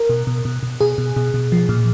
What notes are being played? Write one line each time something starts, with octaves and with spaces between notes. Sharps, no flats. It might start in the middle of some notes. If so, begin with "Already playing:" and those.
Already playing: A#4
B2
B2
B2
B2
B2 G#4
B2
B2
B2
F3
A#2